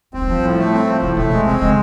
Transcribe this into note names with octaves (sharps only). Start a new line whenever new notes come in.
F#3 C4
G#3
F3 G3
A2
A3
C4
F3
A2 C#3
B2 A3
B2 G#3
C#3 C4
D3 G#3